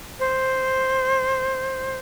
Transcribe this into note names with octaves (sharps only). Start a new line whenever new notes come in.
C5